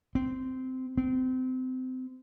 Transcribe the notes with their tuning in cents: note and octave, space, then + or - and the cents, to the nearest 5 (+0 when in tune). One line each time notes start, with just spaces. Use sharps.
C4 -15
C4 -30